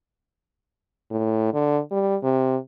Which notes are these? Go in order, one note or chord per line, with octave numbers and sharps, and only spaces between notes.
A2
D3
G3
C3